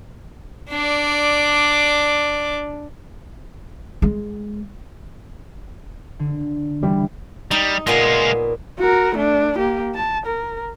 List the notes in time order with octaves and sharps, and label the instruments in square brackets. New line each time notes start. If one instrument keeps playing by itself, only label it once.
[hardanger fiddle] D4 D5
[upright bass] G#3
[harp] D3
[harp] D3 E3 [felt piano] G3
[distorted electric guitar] G3 [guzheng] D#4
[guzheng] A#2 B3 G#5 [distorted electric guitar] G#3 F4
[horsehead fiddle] F#4 A#4
A3 D4
A#3 G4
A5
A#4